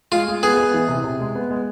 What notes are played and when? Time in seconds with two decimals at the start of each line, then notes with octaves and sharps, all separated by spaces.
0.12 G#3 F4
0.28 G#3
0.43 B3 G#4
0.58 B3
0.74 E3
0.88 C3
1.04 C3
1.20 G#3
1.35 B3
1.50 G#3